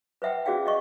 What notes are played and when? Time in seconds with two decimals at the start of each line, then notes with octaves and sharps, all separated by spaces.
0.22 B4 C5 E5 F#5 G5
0.46 C#4 F#4 G#4 D5 F5 G5
0.66 D5 D#5 C#6